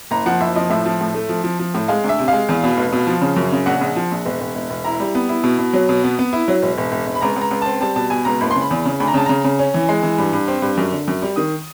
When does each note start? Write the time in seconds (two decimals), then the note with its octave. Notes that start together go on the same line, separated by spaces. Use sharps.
0.11 F#1 A#5
0.26 F3 F#5
0.40 F#1 E5
0.55 F3 D#5
0.70 A2 E5
0.86 F3
1.01 A2
1.14 A3
1.29 F3
1.44 F3
1.59 F3
1.74 A2
1.88 G#3 F5
2.04 D2
2.09 E5
2.19 C3
2.28 G#3 F5
2.49 E2
2.63 B2
2.77 F1
2.93 B2
3.07 F3
3.22 C#3
3.36 F#2
3.52 C#3
3.66 A#1 F#5
3.81 A#1
3.96 F3
4.12 A#1
4.26 E1
4.41 E1
4.55 E1
4.70 E1
4.84 E4 A#5
5.00 G3
5.15 B3
5.29 E4
5.44 B2
5.59 B2
5.73 F#3
5.89 B2
6.04 B3
6.19 B3
6.33 E4
6.48 F#3
6.62 E1
6.78 E1
6.92 E1
7.07 E1
7.15 B5
7.21 C#2 A#5
7.36 C#2
7.41 A#5
7.51 C#2
7.62 C4 A5
7.81 G3 A5
7.96 B2 A5
8.10 B2 G#5
8.25 C#2 A#5
8.40 F#1 B5
8.51 C6
8.56 C#3
8.61 B5
8.71 E2
8.85 C#3
9.00 D2 B5
9.08 A#5
9.14 C#3 A5
9.26 C#3 A#5
9.44 C#3
9.59 C#4
9.74 E3
9.89 G#3
10.03 E3
10.18 G2
10.33 G2
10.48 C4
10.62 G2
10.77 F#2
10.92 D3
11.08 F#2
11.22 G3
11.36 D#3 D#6